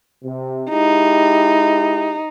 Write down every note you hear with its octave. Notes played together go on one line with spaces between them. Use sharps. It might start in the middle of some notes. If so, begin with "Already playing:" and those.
C3
G#3 D#4 E4 G4